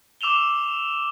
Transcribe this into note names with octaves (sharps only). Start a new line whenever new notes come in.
D6 E6 E7 F7 G7